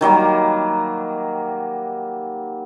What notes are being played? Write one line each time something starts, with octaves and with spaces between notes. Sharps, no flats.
D#3 F#3 G3 A#3